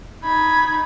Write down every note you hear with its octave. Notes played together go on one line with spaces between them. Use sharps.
D#4 B5 G#6